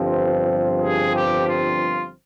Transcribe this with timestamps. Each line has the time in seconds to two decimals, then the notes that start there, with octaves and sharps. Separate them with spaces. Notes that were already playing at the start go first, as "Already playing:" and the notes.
Already playing: G1 G2 F3 C4
0.83 G#4
1.16 G4
1.48 F4